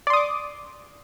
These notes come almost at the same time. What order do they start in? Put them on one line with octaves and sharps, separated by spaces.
D5 C6 D#6 D6